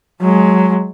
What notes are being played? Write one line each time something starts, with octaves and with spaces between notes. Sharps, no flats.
F#3 G#3